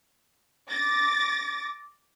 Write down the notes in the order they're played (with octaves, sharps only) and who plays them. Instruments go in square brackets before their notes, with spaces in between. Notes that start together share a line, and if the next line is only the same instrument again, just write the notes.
[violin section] D6 A6 A#6